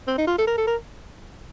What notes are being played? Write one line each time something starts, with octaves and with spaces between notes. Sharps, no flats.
C4
D#4
F4
A4
A#4
A4
A#4